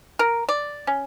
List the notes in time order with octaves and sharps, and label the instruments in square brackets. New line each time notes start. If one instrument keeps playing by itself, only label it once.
[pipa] A#4
D5
C#4